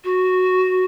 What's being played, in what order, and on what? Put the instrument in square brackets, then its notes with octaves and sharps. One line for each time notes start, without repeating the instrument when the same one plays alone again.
[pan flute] F#4